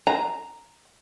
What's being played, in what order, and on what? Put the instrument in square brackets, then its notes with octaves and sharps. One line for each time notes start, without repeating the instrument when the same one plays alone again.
[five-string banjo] A#5